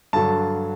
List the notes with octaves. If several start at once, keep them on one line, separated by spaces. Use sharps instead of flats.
G2 D3 F#3 A5